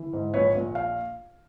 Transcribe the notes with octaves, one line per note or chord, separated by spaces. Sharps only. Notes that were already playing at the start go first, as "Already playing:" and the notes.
Already playing: E3
G#2
A#1 B4 C#5
A#1
F5